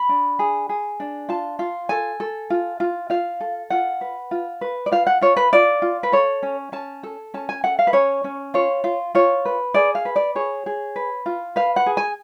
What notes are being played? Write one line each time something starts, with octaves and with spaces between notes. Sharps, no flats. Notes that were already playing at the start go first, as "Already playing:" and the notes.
Already playing: B5
D4
G#4
G#4
D4
F4 A5
F4
A4 G#5
A4
F4
F4
F4 F5
A4
F4 F#5
B4
F4
B4
D5
F4 F5
F#5
F4 C#5
B4
F4 D5
F4
B4
A4 C#5
C#4
C#4 A5
A4
C#4 A5
G#5
A4 F#5
F5
B4
C#4 C#5
C#4
F4 C#5
F4
F4 C#5
B4
G#4 D5
F5
B4
D5
G#4 C#5
G#4
B4
F4
B4 F5
F#5
G#4
G#5